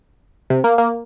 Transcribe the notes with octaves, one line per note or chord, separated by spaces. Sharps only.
C3
A#3
A#3